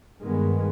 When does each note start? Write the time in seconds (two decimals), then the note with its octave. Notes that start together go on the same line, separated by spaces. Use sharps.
0.21 G2 D#3 G#3 B3